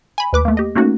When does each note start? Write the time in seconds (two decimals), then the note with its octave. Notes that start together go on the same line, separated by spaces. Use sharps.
0.18 G#5 B5
0.33 D#2 B4 D6
0.45 A3 A#3
0.57 G4 D#5
0.75 A3 A#3 C#4 D#4 F#4